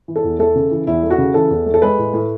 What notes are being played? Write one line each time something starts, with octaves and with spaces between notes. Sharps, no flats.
E3
A4
E2
A3 A4
C#3
E3
E2 E4
A3
F#4
C#3
E3 A4
E2
A3
A4
G#3 B4
A2
A2